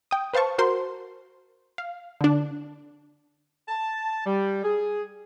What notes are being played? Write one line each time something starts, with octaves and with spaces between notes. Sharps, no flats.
G5 D#6
B4 C5 F5 A5 C#6
F#4 A#4 C5 C6
F5
D3 D4
A5
G3
G#4